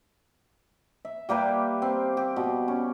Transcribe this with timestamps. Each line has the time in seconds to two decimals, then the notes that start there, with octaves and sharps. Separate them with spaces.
1.05 E5
1.29 G3 A#3 G4 B4
1.82 C4
2.17 G4
2.36 B2
2.68 C#4